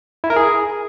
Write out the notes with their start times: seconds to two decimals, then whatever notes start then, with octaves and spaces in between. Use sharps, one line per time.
0.24 E4
0.30 A#4
0.36 G#4